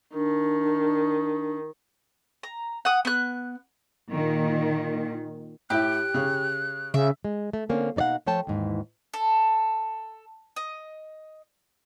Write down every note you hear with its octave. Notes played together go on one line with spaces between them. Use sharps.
D#3 D4
A#5
F#5 D#6
B3 F#6
A#2 D#3
A2 E4 G4 F#6
C#3
C#3 E5
G#3
A3
D3 A#3 C4 C#4
B2 D#4 D5 F5 F#5
F3 A3 C#5 G5 A5
D#2 G#2 E3
A4
D#5